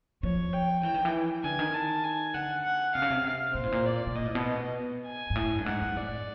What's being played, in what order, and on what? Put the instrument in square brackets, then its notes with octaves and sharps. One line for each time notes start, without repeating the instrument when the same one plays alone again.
[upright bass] F3 [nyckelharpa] C#5
[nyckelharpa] G5
[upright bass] E3 [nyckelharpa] G5
[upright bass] D#3
E3
[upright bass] D3 [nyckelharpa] G#5
[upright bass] D#3
[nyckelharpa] A5
G#5
[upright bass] D3 [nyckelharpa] F#5
[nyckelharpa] F#5
[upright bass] C3 [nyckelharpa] F5
[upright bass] C#3
C3
[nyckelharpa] F5
[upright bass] A#2 [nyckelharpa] C5
[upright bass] A2
A#2
[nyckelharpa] D5
[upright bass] B2
[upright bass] A#2 [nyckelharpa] D#5
[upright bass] A2
B2
[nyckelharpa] G#5
[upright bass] G#2
A2
G2
[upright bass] G#2 [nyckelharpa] F#5
[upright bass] F#2
[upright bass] A2 [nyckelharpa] D5